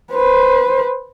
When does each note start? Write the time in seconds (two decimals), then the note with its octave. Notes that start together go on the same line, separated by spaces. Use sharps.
0.12 B4 C5